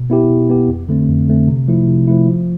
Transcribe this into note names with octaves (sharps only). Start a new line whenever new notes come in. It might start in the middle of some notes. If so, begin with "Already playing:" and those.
Already playing: B2
B3 E4 G4
B2
B3 E4 G4
F2
D3 A3 C4
F2
D3 A3 C4
C3
F3 A3 E4
C3
F3 A3 E4
F3